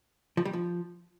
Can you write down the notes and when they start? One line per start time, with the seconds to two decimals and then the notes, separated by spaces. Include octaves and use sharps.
0.37 F3
0.45 G3
0.53 F3